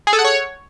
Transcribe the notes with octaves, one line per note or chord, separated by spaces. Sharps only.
G#4
A4
F#5
C#5